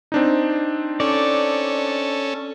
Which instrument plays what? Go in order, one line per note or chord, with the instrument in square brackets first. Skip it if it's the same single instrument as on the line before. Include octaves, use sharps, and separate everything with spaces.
[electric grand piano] C4 D4 D#4
[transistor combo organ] C#4 A4 [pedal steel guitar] D5